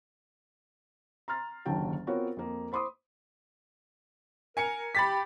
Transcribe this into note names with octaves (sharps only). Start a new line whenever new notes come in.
A#5 C6 F6 A6
F#1 D#2 D3 F#3 G5 A5
B3 C4 F4 F#4 A#4 C#5
F2 A#3
C5 B5 C6 D6 D#6
A#4 G#5 C#7
G4 B5 A6 B6